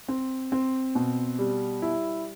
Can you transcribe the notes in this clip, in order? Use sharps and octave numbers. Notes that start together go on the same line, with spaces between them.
C4
C4
B2
G3
E4